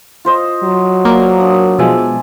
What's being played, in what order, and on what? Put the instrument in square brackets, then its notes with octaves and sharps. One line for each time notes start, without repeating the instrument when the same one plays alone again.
[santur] F4 C5 D#5
[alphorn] F#3
[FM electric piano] A#3 [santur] D5
[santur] D4 D#6
[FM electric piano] B2 F3 G#3 [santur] E5 G#5 A5